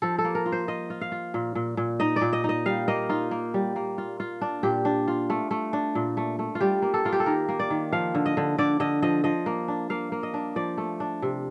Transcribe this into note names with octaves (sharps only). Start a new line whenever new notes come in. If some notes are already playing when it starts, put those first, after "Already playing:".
F3 A4
A4
A#3
A#4
F4
C5
F4 D#5
F4
F5
F4
A#2
A#2
A#2
D#4 D#5
D5
A#2
D#5
D#4 D#5
G3 F5
A#3 D#5
D#4 F4
A#3
G3
A#3
F4
F4
D4
A#2 G4
D4
F4
A3
A3
D4
A#2
A3
A3
F4
G3 G4
A#3
A4
A#3 F4
G4
A4
D#3 A#4
A#3
D5
D#3
F3 F5
D3
D#5
D3
D3 D5
D3 D#5
F3 D#5
F3 D#5
A#3
D4
A#3 F5
A#3
D#5
D4
F3 D5
A3
D4
C3